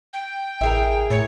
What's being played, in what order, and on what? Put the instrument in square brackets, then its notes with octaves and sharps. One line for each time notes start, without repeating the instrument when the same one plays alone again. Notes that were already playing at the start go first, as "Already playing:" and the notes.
[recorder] G5
[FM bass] A1 [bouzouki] E4 G#4 A#4
[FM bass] A2 [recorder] C#5